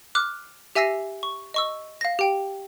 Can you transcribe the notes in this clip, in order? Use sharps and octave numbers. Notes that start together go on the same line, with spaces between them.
D6 F6 F#6
G4 E5 G#5 E6 A#6 C7
C#6
D#5 C#6 E6
F5 A#6
G4 G5 D7